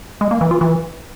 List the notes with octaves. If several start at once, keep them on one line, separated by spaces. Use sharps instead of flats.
G#3
A#3
E3
F4
E3